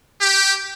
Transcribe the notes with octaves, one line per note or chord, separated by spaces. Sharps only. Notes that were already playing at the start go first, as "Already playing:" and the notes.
G4